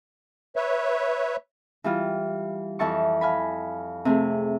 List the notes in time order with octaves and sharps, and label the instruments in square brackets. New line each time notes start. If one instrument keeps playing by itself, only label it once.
[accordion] B4 C#5 E5
[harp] E3 G3 F4
F2 E3 E5 A5 C#6
F5 G#5 B5
C3 A3 G#4